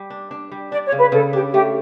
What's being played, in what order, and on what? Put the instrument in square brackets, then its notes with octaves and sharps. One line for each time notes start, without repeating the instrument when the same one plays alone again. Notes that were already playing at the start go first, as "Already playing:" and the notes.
Already playing: [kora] G3
D4
D4
G3
[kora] D4 [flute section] D5
[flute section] C#5
[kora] C#3
[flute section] B4
[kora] C#3 [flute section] A4
[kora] D4 [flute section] G4
[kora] A3 [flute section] G4